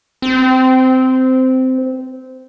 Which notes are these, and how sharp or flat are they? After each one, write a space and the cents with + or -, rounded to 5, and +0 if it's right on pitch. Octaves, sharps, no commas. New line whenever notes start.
C4 -15